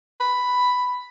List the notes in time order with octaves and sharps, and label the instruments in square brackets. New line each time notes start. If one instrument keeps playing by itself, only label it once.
[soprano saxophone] B5